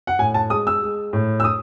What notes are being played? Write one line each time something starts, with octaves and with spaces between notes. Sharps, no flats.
F#5
A2 G#5
A5
G#3 D#6
E6
G#3
A2
E6
D#6